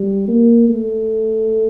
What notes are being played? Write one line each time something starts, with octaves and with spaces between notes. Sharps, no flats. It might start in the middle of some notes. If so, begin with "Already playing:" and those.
Already playing: G3
A#3
A3